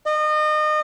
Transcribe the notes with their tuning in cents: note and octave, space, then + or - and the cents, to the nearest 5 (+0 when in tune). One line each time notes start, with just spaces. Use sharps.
D#5 -30